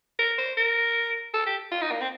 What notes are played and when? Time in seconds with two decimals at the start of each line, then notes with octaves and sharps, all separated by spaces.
0.19 A#4
0.38 C5
0.57 A#4
1.34 A4
1.46 G4
1.71 F4
1.81 D#4
1.91 A#3
2.01 C4